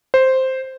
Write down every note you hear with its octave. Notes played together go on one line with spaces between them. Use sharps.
C5